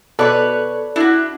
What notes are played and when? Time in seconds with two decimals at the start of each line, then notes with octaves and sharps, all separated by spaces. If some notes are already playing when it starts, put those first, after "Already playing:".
0.19 B2 A4 B4 C#5 D5 B5 F#6
0.96 D4 E4 F#4